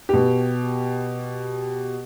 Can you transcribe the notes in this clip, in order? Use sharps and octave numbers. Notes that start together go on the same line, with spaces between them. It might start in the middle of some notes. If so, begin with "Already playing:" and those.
B2 G4